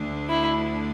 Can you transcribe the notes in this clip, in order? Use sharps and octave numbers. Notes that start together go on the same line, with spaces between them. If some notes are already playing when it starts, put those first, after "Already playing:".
Already playing: D2 D3 A3 D4
E4